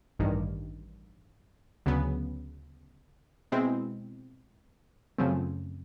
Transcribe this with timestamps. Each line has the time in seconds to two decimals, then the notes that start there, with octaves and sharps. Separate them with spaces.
0.19 A1 G2 D#3
1.86 D2 C#3 F#3 B3
3.52 B2 G#3 C4 E4
5.18 F#2 C#3 F3 A3 C4